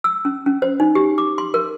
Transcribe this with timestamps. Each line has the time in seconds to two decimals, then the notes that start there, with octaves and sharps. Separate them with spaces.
0.04 E6
0.25 C#4
0.46 C#4
0.62 C5
0.80 D#4
0.95 G4
1.18 D6
1.38 C6
1.54 A#4